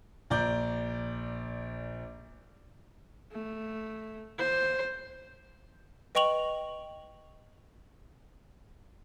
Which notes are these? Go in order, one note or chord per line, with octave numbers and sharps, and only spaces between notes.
A#1 D5 A#5 G6
A3
C5
B4 D#5 G5 C#6 F7 F#7